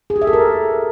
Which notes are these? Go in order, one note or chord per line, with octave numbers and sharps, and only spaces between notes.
G#4
G4
E5
A4
A#4